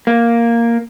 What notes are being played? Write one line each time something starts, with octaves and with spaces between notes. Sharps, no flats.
A#3